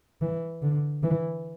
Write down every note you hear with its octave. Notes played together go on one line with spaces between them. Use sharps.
E3
D3
E3